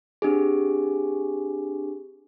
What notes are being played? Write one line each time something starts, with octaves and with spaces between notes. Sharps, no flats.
C4 D4 G4 G#4